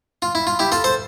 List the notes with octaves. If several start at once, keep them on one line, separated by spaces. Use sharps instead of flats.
F4
E4
F4
E4 G4
F4 A4
A4 C5